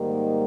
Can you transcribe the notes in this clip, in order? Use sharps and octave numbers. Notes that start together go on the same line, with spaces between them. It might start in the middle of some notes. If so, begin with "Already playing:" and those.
Already playing: G#2 D#3 G3 A#3